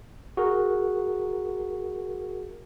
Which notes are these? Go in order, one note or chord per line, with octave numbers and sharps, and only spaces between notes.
F#4 G#4 A#4